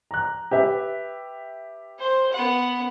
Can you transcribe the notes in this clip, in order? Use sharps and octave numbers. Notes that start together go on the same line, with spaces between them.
A#5 F#6
G4 B4 E5
C5
B3 F#5